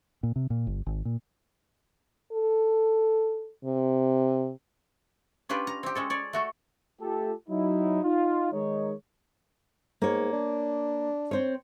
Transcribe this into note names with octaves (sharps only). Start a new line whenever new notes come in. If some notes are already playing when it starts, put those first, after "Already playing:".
A#2
C3
A#2
G1
G#1
A#2
A4
C3
C#4 D4 F4 G4 B4
A#5
C4 G4
G#3 C#4 A4
C#5 D5
A3 F#4 A4
A3 F4 G4 A4
F#3 D#4 E4
D#4 F4
D#3 G#3 D#4 C#5
G#2 A#3 C#5
D4
C4 C5 C#5